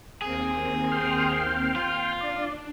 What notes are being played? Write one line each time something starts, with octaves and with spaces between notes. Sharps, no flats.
D#2 A#3 C4 G#4
G5 C6 F6
F4
D4 D5